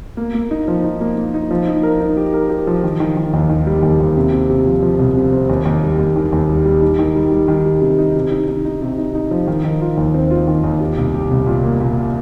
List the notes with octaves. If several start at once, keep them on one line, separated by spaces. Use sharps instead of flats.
A#3
A#3
D#4
F3
D#4
A#3
A#3
D#4
F3
D#4
A#4
D#4
G4
A#4
G4
F3
D#3
D#3
D#3
D#2
D#3
G3
D#2
D#2
C3
C3
C3
F3
F3
C2
C3
C4
D#2
D#2
G3
D#2
D#3
D#2
G3
G3
D#4
D#3
G3
G3
D#3
G3
C3
D#4
C3
D#4
D#4
D#4
C3
D#4
D#4
F3
D#3
D#3
F4
D#2
C4
F4
D#3
D#2
G4
C2
G4
C2
A#2
A#3
A#2